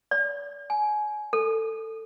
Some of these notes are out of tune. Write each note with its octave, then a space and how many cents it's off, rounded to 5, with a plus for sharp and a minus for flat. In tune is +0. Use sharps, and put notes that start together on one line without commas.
D5 -35
G#5 +25
A4 +20